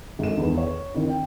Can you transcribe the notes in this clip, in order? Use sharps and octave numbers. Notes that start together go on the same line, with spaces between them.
G#1 A4 E7
E2 D#3 E4 B4
C#5
D#3 C4 E4
G5